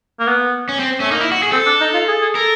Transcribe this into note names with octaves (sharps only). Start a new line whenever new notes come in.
A#3
B3
C#4
C4
A3 C#4
A#3 D#4
E4
F#4
G#4
C4 A4
D4
D#4
F4
G#4
G#4
A4 A#4